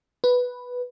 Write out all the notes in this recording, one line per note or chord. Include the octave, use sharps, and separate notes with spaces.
B4